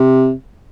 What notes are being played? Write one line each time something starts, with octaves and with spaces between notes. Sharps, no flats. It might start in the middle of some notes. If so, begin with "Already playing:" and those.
Already playing: C3